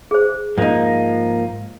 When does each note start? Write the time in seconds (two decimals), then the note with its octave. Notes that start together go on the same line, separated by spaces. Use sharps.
0.11 G#4 C5
0.58 G#2 F3 A#3 D#4